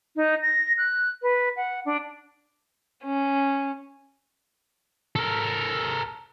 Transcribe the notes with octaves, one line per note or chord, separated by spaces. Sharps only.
D#4
A#6
F#6
B4
F#5
D4
C#4
A4 A#4